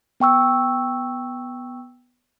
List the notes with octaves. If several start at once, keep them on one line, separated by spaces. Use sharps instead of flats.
B3 G5 C#6 E6